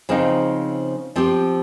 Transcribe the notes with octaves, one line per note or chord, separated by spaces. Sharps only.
C#3 F3 C4 D#4
F3 C4 G4